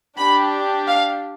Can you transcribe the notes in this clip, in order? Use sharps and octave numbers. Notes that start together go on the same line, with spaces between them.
D4 G4 B5
F5